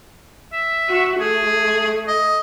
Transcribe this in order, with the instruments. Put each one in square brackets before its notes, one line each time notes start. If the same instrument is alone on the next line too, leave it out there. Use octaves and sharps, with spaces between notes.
[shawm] E5
[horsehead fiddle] F#4
[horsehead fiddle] A3 [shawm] G#4
[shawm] D#5